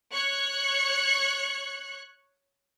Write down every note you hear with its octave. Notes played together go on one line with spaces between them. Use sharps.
C#5 C#6 F#6